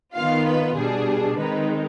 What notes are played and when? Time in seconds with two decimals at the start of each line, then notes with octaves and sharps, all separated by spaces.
0.15 D#3 B3 F4 F5
0.46 B4
0.76 B2 G3 D4 G#4
1.38 D#3 G#3 C4 D#4 B4